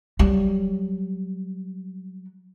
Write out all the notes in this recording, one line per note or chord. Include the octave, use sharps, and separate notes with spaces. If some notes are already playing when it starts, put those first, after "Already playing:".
F#3 G3